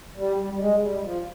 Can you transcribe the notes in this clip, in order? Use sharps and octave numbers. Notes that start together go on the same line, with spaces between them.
G3
G3
G3
G#3
G3
F3